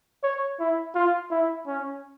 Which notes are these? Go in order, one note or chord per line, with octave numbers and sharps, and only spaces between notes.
C#5
E4
F4
E4
C#4